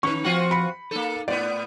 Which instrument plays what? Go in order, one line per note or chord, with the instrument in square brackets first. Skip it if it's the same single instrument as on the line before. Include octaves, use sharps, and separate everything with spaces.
[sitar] D#3 B4 [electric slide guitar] C#4 D#4 [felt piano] C#6
[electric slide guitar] F3 F#5 [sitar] C4 F4 F#4
[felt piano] B5 C#7
[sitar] A#3 A4 [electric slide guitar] D#4
[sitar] A2 B3 [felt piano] D5